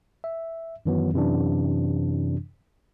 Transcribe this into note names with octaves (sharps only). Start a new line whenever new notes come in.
E5
F#2 D#3 E3 F#3 B3
F#2 C3 E3 D4